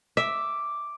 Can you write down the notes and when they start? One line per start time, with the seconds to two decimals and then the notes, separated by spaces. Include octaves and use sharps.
0.17 E5 D6